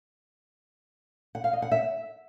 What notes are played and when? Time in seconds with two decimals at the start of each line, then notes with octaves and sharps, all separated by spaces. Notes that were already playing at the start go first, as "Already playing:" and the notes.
1.35 F#5
1.44 F5
1.53 D#5
1.62 F#5
1.72 E5